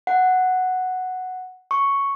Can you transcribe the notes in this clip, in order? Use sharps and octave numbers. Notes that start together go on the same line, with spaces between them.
F#5
C#6